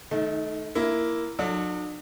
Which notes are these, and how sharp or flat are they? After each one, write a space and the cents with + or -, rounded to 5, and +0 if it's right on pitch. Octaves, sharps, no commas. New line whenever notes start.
D#3 +0 A3 -20 D#4 +30
A#3 +0 E4 +10
F#3 -30 D4 +45 A4 +0